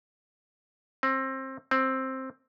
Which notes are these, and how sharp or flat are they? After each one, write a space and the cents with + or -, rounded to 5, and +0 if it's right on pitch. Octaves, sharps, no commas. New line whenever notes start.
C4 +25
C4 +10